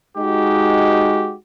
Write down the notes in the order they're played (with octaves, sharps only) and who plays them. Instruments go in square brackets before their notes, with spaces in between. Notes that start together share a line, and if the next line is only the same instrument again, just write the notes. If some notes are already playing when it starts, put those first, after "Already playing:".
[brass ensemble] G#3 D#4 F#4 G4